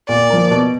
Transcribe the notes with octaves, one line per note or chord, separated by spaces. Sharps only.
A#2 D5
F3 A#3
B2